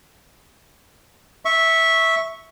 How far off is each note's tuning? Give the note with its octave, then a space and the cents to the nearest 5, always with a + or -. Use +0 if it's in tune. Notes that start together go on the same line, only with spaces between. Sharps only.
E5 -10 C#6 +0